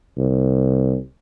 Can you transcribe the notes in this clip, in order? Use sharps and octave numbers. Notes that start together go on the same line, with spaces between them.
C2